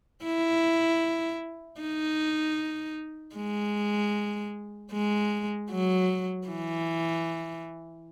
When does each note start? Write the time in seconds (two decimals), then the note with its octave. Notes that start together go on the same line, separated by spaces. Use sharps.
0.24 E4
1.81 D#4
3.36 G#3
4.92 G#3
5.71 F#3
6.48 E3